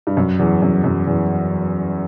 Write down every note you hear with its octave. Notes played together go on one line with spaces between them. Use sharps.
G2
F#2
E2
F#2
F#2
E2